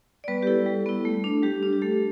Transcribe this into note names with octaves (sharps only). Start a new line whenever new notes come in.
D5
G3 B3 B4
G4
E4 A4
G3
B3 E4
A3
D4
G3 G4
D4
G4
A3 A4